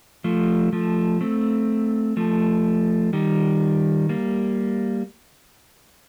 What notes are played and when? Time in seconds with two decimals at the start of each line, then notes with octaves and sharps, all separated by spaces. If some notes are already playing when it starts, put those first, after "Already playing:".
0.24 F3 A3
0.73 F3 A3
1.21 A3 C4
2.17 F3 A3
3.13 D#3 G3
4.09 G3 A#3